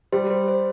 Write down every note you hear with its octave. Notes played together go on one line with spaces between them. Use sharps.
G3 C5
C5
C5